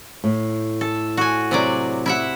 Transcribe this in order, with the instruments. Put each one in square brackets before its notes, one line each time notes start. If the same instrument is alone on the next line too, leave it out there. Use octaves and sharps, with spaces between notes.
[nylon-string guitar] A2
[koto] A4
F#4 G#5
C3 F#3 D5
E4 E5 F#5